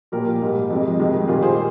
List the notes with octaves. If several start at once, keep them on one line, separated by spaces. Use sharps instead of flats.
A#2 F3 A#3 G4 A#4
G#2 G3 A#3
F2 C3 F3 G#3
F2 C3 D#3 G#3
A#2 G3 A#3 F4 G#4
G#4 C5